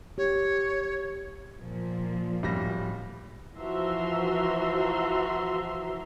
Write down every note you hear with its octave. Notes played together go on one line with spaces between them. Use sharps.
G4 C#5
A#2 F3
D1 G3 A#6
E3 F3 F#4 E5 A#5 C6